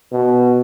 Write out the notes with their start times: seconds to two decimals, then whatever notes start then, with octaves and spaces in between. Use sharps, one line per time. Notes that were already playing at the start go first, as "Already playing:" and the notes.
0.12 B2